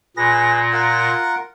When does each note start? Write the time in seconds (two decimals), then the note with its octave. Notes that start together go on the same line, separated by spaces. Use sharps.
0.17 A#2 G#4 B4 A#6
0.73 F4 A#4 F#5